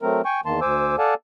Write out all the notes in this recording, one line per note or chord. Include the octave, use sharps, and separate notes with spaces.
F#3 A3 C4 A#4
G5 G#5 C#6
E2 D#3 A#3 A5 C6
D2 C5 G#5 D6 E6
A4 D5 F5 F#5 G#5 A5